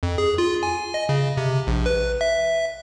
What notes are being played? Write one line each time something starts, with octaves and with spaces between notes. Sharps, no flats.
F2
G#4
F4
G#5
D#5
C#3
C3
A#1
B4
E5